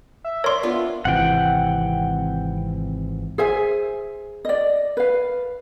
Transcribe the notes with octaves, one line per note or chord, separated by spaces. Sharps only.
E5
A#4 C#5 D5 C6
B3 D4 F4
G#1 C3 E3 F#5 G5
G#4 C5 E5 G#5
D5 D#5
B4 F5